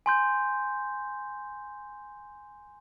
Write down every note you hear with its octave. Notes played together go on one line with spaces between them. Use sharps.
G#5 C6 G6